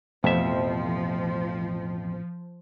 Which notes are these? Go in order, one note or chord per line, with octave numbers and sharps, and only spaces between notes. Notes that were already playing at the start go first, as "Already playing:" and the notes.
A1 F2 B2 F3 A3 E5